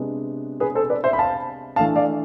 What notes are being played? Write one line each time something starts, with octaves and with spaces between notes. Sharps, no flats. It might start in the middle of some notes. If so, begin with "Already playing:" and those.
Already playing: C3 G#3 B3 D4
G#4 B4
A4 C5
B4 D5
C5 E5
B5
F5 A5
E3 A3 D4 F5 A5
D5 F5